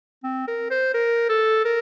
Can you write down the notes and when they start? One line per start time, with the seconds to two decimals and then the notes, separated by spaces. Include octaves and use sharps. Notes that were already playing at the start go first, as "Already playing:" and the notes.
0.24 C4
0.48 A#4
0.71 C5
0.94 A#4
1.29 A4
1.65 A#4